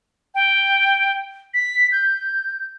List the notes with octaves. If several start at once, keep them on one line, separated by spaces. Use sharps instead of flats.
G5
B6
G6